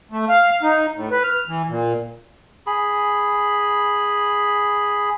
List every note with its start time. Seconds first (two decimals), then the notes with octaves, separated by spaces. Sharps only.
0.12 A3
0.29 F5
0.51 F5
0.63 D#4
0.96 A2
1.11 B4
1.24 F6
1.48 E3
1.69 A#2
2.67 G#4 B5